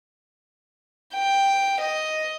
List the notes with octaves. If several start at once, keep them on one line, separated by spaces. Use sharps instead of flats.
G5
D#5